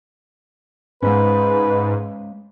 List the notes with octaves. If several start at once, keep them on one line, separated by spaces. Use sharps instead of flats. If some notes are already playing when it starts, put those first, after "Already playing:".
G#2 G#3 B3 C#4 B4